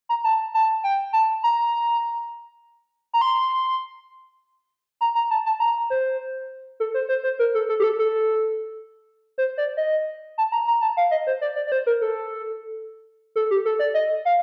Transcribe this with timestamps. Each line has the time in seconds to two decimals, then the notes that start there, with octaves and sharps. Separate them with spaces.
0.09 A#5
0.24 A5
0.54 A5
0.84 G5
1.13 A5
1.43 A#5
3.13 A#5
3.21 C6
5.01 A#5
5.15 A#5
5.30 A5
5.46 A5
5.60 A#5
5.90 C5
6.80 A4
6.94 C5
7.09 C5
7.24 C5
7.39 A#4
7.55 A4
7.69 A4
7.80 G4
7.83 A4
7.99 A4
9.38 C5
9.58 D5
9.77 D#5
10.38 A5
10.52 A#5
10.68 A#5
10.81 A5
10.97 F5
11.11 D#5
11.27 C5
11.41 D5
11.56 D5
11.67 D5
11.72 C5
11.86 A#4
12.02 A4
13.36 A4
13.51 G4
13.65 A4
13.79 D5
13.94 D#5
14.25 F5